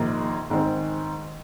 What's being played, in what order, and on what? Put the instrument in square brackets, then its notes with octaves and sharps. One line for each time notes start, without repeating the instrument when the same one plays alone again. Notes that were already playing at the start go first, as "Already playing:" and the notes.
Already playing: [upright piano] A#1 G#2 D#3 A#3 D#4
G#2 D#3 G#3 C4